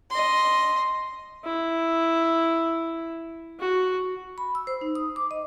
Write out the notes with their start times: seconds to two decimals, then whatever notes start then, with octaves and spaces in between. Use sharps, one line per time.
0.11 D#5 C6
1.45 E4
3.60 F#4
4.38 B5
4.55 E6
4.67 C5
4.81 D#4
4.95 D#6
5.16 D6
5.31 D#5